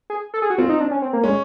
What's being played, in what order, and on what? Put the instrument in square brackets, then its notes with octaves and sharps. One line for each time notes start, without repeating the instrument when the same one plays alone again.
[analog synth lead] G#4
A4
G#4
F#4
[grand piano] C4 [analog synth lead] F4
[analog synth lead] D#4
D4
C#4
C4
A#3
[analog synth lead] G#3 [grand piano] C#4